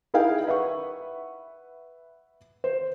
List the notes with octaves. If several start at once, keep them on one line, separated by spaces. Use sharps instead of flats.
D#4 E4 G#4 A#4 F5 G5
B4 E5 F#5 C#6
C5